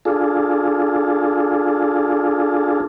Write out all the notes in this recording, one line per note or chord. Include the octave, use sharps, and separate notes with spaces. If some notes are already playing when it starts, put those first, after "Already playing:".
D4 F4 G#4 A4